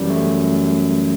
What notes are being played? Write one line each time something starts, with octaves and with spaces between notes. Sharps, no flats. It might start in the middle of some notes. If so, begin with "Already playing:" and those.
Already playing: F#2 E3 G3
A3